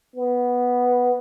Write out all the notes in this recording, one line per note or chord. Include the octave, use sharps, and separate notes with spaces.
B3